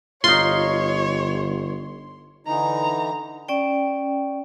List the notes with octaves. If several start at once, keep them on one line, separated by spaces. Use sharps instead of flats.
G1 D#4 F4 C#5 C6
D3 E3 D#4 A#5
C#4 D5 G5